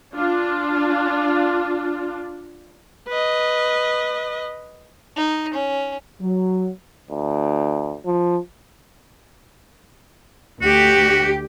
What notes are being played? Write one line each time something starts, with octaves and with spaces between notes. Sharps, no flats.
D4 F4
B4 D#5
D#4
C#4
F#3
D2
F3
D2 F#4 G4